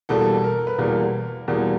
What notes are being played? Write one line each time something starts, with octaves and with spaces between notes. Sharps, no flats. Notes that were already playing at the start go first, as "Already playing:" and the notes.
E2 B2 G3 A#3 A4
A#4
B4
E2 B2 G3 A#3 A#4
E2 B2 G3 A#3